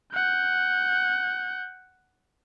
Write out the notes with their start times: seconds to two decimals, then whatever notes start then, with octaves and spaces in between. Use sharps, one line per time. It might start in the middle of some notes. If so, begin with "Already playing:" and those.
0.13 F#5 G6